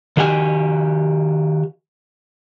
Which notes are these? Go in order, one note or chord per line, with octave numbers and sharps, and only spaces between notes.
D#3 F#4 G4 G#5